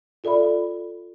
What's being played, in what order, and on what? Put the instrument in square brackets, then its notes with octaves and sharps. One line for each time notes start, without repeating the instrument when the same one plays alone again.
[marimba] F4 A4 D5 E5 B5